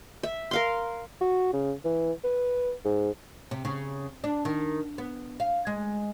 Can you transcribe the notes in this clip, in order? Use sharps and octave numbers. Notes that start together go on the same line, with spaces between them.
E5
A#4 F5 C6
F#4
C#3
E3
B4
G#2
C3
C#3
D4
D#3
B3
F5
G#3